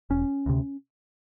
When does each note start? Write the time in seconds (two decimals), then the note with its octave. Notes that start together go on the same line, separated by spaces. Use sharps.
0.10 E1 C#4
0.46 D2 C3